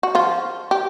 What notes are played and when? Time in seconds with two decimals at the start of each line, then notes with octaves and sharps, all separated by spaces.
0.03 F#4
0.15 F3 F4
0.71 G4